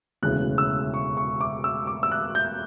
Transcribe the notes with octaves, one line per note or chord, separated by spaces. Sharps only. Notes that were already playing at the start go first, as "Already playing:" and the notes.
E1 D2 C#3 E3 F#6
E6
C#6
C#6
D6
E6
D6
E6
F#6
G6